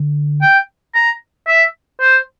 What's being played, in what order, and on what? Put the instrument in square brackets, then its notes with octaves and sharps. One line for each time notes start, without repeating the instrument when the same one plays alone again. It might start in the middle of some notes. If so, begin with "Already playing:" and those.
Already playing: [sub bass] D3
[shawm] G5
A#5
E5
C5